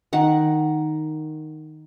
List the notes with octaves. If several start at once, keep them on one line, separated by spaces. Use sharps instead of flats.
D#3 F#5